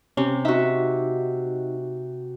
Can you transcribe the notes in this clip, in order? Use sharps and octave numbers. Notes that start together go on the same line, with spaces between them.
C3 C#4
D#4 F#4 E5